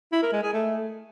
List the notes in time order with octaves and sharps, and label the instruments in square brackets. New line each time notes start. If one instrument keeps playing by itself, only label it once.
[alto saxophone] E4
A#4
G#3
G#4
A3